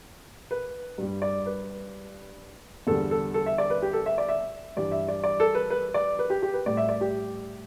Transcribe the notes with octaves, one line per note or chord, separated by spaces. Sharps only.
B4
G2 G3
D5
B4
E2 D3 G3 A4
A4
A4
E5
D5
B4
G4
A4
E5
D5
E5
G2 E3 G3 D5
E5
D5
D5
A4
B4
B4
D5
B4
G4
G4
B4
A2 G3 D5
E5
D5
G4